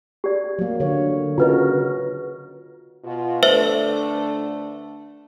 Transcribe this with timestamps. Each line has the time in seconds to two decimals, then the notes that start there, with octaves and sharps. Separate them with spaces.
0.24 G4 D5
0.59 F#3 A#3
0.80 D3 C#5
1.38 C#3 F4 F#4 A#4 B4 D#5
3.04 B2 F4
3.43 D3 A3 D4 B4 C5 E5